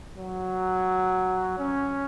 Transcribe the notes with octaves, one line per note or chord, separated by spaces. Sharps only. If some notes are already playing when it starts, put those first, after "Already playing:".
F#3
C#4